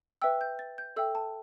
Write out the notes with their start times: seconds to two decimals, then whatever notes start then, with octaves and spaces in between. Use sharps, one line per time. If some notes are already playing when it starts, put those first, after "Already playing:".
0.22 B4 E5 G5 E6
0.41 G6
0.59 A6
0.78 G6
0.96 A4 E5 G5 E6
1.15 A5